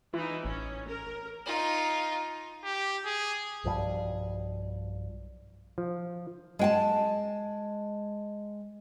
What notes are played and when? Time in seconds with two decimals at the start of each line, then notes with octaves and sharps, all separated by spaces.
0.14 E3 D#4 F4
0.45 A1 C#4
0.88 A#4
1.46 D#4 F4
2.64 G4
3.05 G#4
3.64 B1 G2 F3 G3
5.78 F3
6.59 G#3 G5 A5